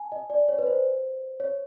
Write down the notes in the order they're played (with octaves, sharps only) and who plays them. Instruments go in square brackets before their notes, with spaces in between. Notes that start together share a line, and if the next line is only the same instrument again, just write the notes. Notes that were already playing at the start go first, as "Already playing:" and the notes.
Already playing: [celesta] G#5 A5
D#5
D5
C#5
B4
C5
C#5